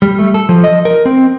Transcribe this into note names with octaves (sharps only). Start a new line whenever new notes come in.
G3
A3
A4
F3
D#5
A#4
C4